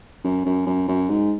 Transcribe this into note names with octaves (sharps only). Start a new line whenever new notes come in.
F#2
F#2
F#2
F#2
G#2